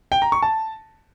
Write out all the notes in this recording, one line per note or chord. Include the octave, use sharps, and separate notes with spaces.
G5
A#5
C#6
A5